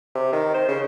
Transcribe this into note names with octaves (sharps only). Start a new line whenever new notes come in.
C3
D#3
C5
C#3